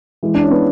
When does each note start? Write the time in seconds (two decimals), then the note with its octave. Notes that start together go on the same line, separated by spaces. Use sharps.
0.23 E3 G#3
0.35 D4
0.43 C#4
0.51 B3